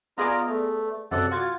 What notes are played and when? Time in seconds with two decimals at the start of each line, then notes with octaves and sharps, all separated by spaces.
0.18 B3 F4 G#4 D5 D#5 A#5
0.47 A3
1.11 F#2 C3 A4 D5 F#5
1.31 F4 F#4 G#6 A6